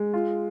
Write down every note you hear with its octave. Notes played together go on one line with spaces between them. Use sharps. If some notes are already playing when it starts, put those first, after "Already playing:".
Already playing: G#3
F4